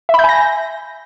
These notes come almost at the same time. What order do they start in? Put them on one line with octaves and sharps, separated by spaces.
E5 B5 G6 G#5 A#6